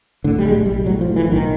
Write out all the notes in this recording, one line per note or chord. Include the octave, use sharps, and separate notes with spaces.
A2 D3
G3
B1 G#3
B1 G3
A2 F#3
F3
A2
E3
B1
D#3